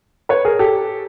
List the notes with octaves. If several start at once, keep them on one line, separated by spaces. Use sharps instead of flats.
B4 C#5
G#4 A#4
G4 A4